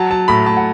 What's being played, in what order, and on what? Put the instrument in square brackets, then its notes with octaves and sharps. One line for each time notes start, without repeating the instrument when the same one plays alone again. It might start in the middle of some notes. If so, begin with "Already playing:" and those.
Already playing: [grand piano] F#3 A5
F#3 A5
A2 B5
A2 A5
F#5